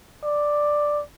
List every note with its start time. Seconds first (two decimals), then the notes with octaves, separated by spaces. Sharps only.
0.24 D5